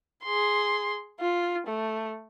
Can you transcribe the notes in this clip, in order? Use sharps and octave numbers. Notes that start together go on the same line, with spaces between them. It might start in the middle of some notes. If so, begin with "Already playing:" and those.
G#4 C6
F4
A3